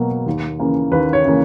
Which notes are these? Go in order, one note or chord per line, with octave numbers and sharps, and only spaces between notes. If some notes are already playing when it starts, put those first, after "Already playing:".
Already playing: B2 F#3 A#3
D#2
C#3 E3 A#3
D#2 B4
C#5
C#3 E3 A#3